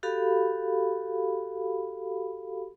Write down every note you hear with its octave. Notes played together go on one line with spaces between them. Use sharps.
F#4 G4 A4 F5 B5